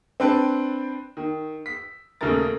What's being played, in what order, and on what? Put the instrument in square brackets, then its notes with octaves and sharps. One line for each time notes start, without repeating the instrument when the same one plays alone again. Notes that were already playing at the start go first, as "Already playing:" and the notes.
[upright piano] C4 D4 B4 G5 A5
D#3
B6
D#1 C#3 A3 A#3 A#4 A6